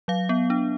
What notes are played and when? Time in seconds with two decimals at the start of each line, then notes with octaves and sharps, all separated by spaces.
0.08 F#3 F5
0.29 B3
0.50 D4